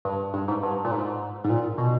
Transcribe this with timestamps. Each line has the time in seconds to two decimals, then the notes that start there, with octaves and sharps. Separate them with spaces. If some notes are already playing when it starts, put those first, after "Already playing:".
0.05 G2
0.34 G2
0.48 G#2
0.63 G2
0.85 A#2
0.91 G#2
1.44 G#2
1.50 A#2
1.78 B2